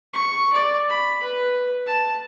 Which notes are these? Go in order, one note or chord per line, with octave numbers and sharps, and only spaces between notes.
C#6
D5
B5
B4
A5